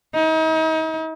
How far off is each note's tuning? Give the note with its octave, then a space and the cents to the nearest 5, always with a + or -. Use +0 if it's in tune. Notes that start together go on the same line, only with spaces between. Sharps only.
D#4 +40